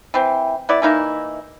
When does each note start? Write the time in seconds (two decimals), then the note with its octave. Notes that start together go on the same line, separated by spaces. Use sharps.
0.14 E3 C4
0.69 B3 E4 D5
0.82 E3 A#3 D#4 E4